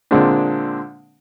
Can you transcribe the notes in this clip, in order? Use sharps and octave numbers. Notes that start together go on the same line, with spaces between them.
A#2 D3 G#3 A#3 C4 D4